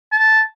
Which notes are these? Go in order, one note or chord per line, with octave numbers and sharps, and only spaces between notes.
A5